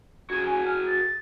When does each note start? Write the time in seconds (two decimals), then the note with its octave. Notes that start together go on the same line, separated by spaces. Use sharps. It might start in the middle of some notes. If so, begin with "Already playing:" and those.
0.30 F#4 G#4 G#6
0.46 G#5
0.65 F6
0.86 A6